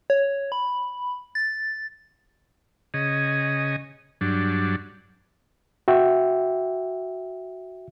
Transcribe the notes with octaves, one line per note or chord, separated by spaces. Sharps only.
C#5
B5
A6
C#3 G#4 D#5
G2 F#3 D4
F#4 E5 G5